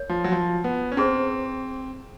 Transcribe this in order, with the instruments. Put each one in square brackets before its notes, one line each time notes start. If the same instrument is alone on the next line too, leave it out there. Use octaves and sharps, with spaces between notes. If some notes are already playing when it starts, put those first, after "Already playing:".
Already playing: [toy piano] A#4 C#5
[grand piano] F3
F#3
F3
B3
C#4
[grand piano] C4 [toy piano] E4 G#4 C5